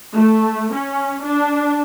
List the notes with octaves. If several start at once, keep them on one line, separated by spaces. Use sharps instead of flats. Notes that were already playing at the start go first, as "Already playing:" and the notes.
A3
C#4
D4